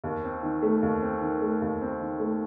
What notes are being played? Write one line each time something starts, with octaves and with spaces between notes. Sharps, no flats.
D#2
C4
D#3
A3
D#2
C4
D#3
A3
D#2
C4
D#3
A3